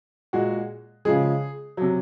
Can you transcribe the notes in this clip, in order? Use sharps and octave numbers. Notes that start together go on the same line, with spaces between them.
A#2 G#3 F#4
C#3 F3 G#3 G#4
C3 F#3